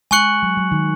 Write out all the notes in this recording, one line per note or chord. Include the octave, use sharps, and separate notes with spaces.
G#3 G#5 C#6 F#6 C#7 F#7
F#3
F#3
D#3